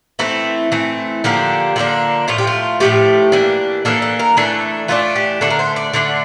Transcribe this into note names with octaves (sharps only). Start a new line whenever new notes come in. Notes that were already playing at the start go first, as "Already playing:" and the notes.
E3 A3 C4 E4
E3 A3 C4
D3 F3 A#3 D4 G4
D3 F3 A#3 D4
A2 F3 A3 F4
G4
F4
A2 F3 A3 G4
E3 A#3 D4
E3 A#3 D4 A4
A4
A#4
E3 A3 D4 A4
E3 A3 D4 F4
G4
D3 A3 D4 A4
A#4
C5
D5
D3 A3 D4